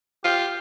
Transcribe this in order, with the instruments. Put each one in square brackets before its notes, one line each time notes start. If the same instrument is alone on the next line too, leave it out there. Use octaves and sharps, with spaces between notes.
[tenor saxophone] F4 [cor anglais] G4